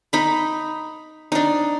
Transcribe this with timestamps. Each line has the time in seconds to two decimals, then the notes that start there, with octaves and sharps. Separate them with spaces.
0.13 D#4 B5
1.32 D4 D#4